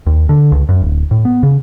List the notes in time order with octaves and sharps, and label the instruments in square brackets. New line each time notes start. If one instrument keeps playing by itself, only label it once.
[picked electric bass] D#2
D3
C#2
F#2
D1
A2
B3
C#3